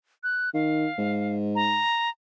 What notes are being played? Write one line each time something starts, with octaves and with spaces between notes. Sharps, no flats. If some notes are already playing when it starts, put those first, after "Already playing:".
F#6
D#3 F5
G#2
A#5